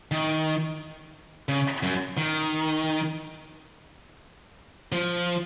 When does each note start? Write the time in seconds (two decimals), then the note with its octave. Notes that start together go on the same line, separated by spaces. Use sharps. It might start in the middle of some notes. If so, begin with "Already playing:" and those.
0.11 D#3
1.49 C#3
1.83 F#2
2.17 D#3
4.92 F3